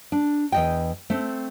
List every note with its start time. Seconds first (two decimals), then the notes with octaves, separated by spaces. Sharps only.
0.12 D4
0.52 E2 D#5 G5
1.10 A3 C4